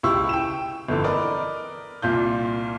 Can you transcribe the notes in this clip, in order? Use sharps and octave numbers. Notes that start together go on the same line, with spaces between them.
C#2 E4 G4 C#6 E6
G5 E7
G1 F2 D3 E3
A#4 B4 D5 D#5
C2 A#2 F4 G6